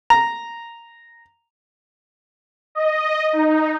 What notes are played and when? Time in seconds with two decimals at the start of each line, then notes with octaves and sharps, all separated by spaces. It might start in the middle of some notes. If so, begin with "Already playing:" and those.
0.10 A#5
2.75 D#5
3.33 D#4